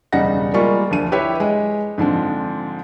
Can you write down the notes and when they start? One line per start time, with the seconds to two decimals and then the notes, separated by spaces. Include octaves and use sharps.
0.12 E1 C#3 G3 D#4 F#5 A#6
0.54 G3 G#3 A#3 F4 C#6
0.91 D2 F3 D#7
1.12 E4 G4 B4 C#5 E5
1.40 G#3
1.98 G#2 D3 F3 C4